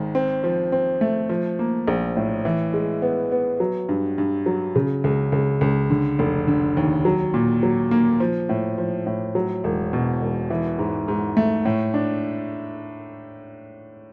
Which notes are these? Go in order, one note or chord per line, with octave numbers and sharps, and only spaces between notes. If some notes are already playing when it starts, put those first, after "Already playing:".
Already playing: G#1 D#3
C4
F3
C4
A3
F3
A#3
A#1
A2
E3
G#3
B3
B3
F#3
G2
G2
F#3
C#3
C#2
C#2
C#2
D3
F1
D3
D#2
F#3
A#2
F#3
A#3
F3
A2
F3
A2
F#3
E1
B2
E1
E3
G#2
G#2
A3
A2
D4